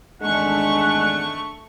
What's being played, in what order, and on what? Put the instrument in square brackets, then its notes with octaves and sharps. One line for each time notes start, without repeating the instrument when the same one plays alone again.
[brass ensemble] G#1 E2 D4 [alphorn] G#3 [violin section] A3 C#6 [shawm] F#5